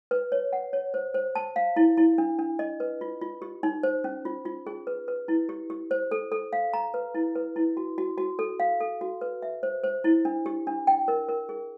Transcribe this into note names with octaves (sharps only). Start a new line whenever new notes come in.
B4
C#5
F#5
C#5
C5
C5
A5
F5
E4
E4
D4
D4
D#5
B4
F4
F4
G4
D#4
C5
C#4
F4
F4
G#4
B4
B4
E4
G4
G4
C5
A4
A4
F5
A#5
B4
E4
B4
E4
F#4
F#4
F#4
A4
F5
A4
F#4
B4
E5
C5
C5
E4
D4
G4
D4
G5
A#4
A#4
G#4